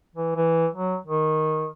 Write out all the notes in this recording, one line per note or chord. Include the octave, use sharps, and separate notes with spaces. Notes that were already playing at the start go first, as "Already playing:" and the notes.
E3
E3
F#3
D#3